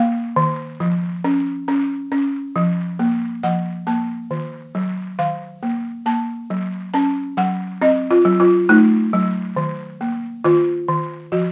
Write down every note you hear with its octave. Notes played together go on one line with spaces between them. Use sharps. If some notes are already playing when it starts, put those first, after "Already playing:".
Already playing: A#3 F5
D#3
F3
C#4
C#4
C#4
F3
A#3
F3 F#5
A#3 A5
D#3
F#3
D#3 F5
A#3
A#3 A5
F#3
C#4 A5
F#3 F#5
C4 D#5
F4
F#3
F4
A3 D#4
F#3
D#3
A#3
D#3 F4
D#3
F3 F#4